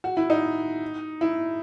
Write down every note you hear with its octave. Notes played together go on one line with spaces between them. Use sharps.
F#4
E4
D#4
E4